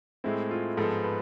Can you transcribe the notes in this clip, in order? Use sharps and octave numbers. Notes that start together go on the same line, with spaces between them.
A2 G#3 C4 E4
F4
G#2 F3 B3 A4
B4